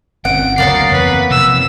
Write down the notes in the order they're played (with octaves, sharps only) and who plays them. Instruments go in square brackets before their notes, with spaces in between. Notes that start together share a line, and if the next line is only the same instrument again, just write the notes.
[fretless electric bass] G1 C4 C#4 [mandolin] F#5 [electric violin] D7
[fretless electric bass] D2 C#3 F#3 [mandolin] A#3 B3 C#5 [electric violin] A6 C7
[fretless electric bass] F2 E3 C4 [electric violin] B4
[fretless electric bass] C3 F3 [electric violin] E6